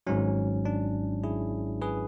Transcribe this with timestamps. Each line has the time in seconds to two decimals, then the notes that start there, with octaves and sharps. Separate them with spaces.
0.07 G#1 G#2 F#3 C#4
0.65 D4
1.24 E4 G#4
1.82 G#4 B4